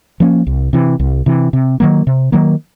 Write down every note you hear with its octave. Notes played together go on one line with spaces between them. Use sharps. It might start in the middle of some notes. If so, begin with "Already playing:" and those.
F3 A#3 C#4
C2
C3 E3
C2
C3 E3
C3
D#3 F#3 A#3
C3
D#3 F#3 A#3